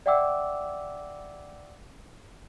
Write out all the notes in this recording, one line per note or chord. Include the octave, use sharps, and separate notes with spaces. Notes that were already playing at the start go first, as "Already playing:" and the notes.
D5 E5 F#5 G5 D6 E6